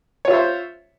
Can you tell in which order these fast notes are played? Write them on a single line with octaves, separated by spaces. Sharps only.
C#5 F4 E5 C5